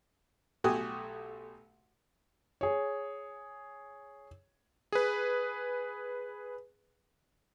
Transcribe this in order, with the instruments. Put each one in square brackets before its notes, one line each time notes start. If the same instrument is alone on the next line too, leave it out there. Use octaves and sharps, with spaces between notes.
[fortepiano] B1 A3 F#4 G4 G#5 D#6
[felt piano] G#4 C#5
[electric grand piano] G#4 B4